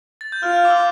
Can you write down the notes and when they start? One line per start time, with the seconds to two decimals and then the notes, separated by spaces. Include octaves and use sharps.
0.21 A6
0.32 G6
0.43 F4 F6
0.56 F6
0.65 D6
0.70 E6